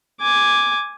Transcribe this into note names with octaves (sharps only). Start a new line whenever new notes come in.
G#5 D6